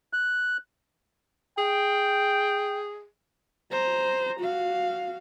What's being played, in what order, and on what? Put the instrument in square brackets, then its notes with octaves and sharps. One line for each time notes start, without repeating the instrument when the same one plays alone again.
[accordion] F#6
[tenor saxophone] G#4 [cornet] G5
[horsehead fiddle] C5 A#5
F#4 F5